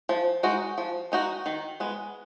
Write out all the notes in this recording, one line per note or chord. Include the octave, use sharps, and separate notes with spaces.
F3
G#3 D#4 F#4
F3
G#3 D#4 F#4
D#3
G#3 B3